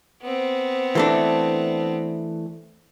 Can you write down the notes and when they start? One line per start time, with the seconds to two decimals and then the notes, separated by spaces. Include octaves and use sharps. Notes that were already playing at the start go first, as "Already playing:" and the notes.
0.22 B3 C4
0.95 E3 A3 D4